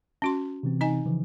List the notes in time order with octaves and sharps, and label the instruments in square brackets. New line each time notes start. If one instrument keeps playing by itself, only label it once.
[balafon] C#4 F#4 C6
[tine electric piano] C3 E3 C4
[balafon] D#4 D#5 G#5
[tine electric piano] C#3 E3 F3